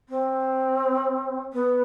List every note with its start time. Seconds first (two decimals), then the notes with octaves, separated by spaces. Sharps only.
0.09 C4
1.53 B3